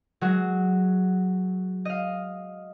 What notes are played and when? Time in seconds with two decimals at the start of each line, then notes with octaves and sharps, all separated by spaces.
0.21 F#3 G#3 F#4
1.85 D#5 F5